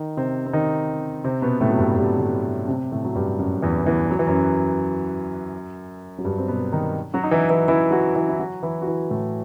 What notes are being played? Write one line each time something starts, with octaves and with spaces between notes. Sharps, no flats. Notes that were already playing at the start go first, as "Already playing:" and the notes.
Already playing: D#3 D#4
C3 C4
C4
D#3 D#4
C3 C4
B2 B3
A2 A3
F#3
G2 G3
G2 G3
A2 A3
C3 C4
A2 A3
F#3
G2 G3
F#2 F#3
E2 E3
E2 E3
F#3
E3
F#2 F#3
F#3
G2 G3
C4
B2 B3
D#3 D#4
F#3 F#4
D#4
E3 E4
E3 E4
E3 E4
F#3 F#4
E3 E4
E4
F#3 F#4
E3 E4
F#4
E3 E4
A2 A3